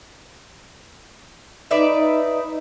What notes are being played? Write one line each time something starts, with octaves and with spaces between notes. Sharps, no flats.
D#4 B4 D5 E5